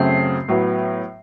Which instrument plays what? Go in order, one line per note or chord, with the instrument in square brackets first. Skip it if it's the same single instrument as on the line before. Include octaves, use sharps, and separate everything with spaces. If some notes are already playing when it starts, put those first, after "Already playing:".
Already playing: [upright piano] F#2 C#3 F#3 A3 C4 C7
A2 F#3 B3